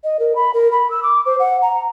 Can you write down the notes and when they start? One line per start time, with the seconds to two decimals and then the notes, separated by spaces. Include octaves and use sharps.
0.04 D#5
0.20 A#4
0.35 B5
0.54 A#4
0.72 B5
0.91 E6
1.03 D6
1.26 C5
1.39 F#5
1.62 A#5